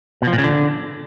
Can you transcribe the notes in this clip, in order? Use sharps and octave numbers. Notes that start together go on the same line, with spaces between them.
B2
F3
A#2
C#3
D3